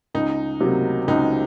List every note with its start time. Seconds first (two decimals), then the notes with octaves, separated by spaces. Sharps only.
0.14 C#2 D#4
0.61 C3 F#3 A#3
1.08 C#2 D#4